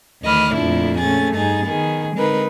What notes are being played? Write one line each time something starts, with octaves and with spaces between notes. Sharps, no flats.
D2 D#3 D#5 B5 D6 F6
F2 A#2 F3 A3 D4 E4
A#2 A3 C#4 G#4 A6
G2 D#4 G#4 A6
D#3 B3 G#4
D3 G#3 C4 D#4 A#4 B4